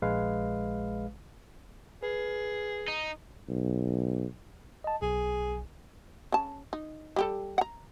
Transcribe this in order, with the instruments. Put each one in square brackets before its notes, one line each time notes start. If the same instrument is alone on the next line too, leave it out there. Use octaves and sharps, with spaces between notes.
[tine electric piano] A#1 G#3 B4 F5
[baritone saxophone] G#4 [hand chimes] B4
[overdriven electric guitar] D#4
[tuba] B1
[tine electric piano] D#5 A5
[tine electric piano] B1 [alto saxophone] G#4
[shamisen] C#3 A5
D#4
G3 G4 A4
F#5 A#5